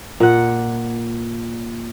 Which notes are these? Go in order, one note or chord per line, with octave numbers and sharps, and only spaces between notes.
A#2 F#5